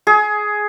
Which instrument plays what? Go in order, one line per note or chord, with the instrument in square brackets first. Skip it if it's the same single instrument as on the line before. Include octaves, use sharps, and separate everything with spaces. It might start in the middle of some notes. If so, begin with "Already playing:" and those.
[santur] G#4